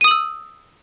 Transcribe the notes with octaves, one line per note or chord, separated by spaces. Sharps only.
D#6 E6 D#7 F#7